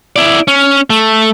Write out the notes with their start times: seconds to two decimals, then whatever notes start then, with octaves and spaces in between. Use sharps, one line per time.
0.16 E4 D5
0.48 C#4
0.90 A3